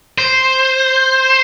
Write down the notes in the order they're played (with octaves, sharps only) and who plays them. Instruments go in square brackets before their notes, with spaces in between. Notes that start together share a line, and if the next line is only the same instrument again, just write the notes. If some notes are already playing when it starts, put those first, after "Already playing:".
[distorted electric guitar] C5